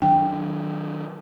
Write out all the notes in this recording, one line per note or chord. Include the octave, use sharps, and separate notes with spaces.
D#3 F#3 D4 G5